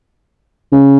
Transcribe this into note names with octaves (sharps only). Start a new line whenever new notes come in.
C#3